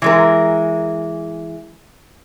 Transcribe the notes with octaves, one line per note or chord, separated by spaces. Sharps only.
E3 G#3 A#4